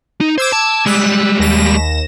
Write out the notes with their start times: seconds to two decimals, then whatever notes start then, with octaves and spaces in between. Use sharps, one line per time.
0.21 D#4
0.38 C5 D6 E6 G#6
0.53 A5
0.86 G3 G#3 E6 F#6
1.39 D#2 A#6 E7